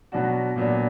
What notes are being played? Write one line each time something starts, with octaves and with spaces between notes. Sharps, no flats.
B2 F#3 B3 D4 F#4
A#2 F#3 B3 D4